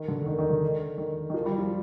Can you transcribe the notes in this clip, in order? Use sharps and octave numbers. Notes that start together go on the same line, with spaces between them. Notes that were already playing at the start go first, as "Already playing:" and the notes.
Already playing: D#3
D3
D#3
D#3
D3
D#3
D#3
F3
G3
F3